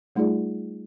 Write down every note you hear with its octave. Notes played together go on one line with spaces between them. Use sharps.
G3 A3 D#4 F4 G#4 D5